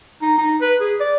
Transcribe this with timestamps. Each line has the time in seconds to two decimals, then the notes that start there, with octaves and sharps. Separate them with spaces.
0.22 D#4
0.38 D#4
0.61 B4
0.81 G#4
1.00 D5